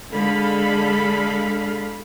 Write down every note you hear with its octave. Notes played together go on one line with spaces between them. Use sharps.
D3 G#3 A4 F5 B5